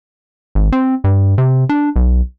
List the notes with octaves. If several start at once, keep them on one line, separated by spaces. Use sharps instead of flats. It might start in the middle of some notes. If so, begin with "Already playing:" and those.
G#1
C4
G2
C3
D4
B1